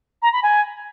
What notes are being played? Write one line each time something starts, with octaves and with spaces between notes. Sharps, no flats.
A#5
B5
G#5